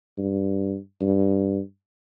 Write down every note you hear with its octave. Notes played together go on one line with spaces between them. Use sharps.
G2
G2